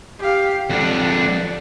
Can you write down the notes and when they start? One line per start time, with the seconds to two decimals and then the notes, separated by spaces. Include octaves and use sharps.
0.19 G4 F5
0.70 F2 D4 F#5